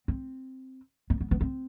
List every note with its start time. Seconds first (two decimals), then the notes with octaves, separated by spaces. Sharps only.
0.08 C4
1.10 B3
1.21 B3
1.31 B3
1.41 C4